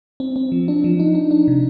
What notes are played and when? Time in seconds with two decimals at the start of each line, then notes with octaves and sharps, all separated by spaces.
0.20 C4
0.36 C4
0.52 F3
0.68 D4
0.84 F3
1.00 D#4
1.15 D4
1.31 D4
1.48 C3